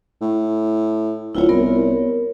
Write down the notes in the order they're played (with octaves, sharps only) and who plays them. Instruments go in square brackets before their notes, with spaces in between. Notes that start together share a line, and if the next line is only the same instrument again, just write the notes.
[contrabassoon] A2
[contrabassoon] D1 [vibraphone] E4 F4 C#5
[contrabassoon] C2 [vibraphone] B3 A#4 C#5